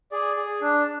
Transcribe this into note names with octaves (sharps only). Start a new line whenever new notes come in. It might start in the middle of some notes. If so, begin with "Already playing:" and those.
G#4 D5
G#4
D4